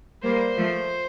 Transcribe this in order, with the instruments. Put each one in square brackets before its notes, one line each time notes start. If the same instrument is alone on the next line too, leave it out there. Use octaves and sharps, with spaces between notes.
[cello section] G3 A#3 [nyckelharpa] C5
[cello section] F3 A3